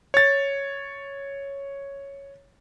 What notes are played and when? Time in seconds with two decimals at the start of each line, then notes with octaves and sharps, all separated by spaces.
0.14 C#5 A6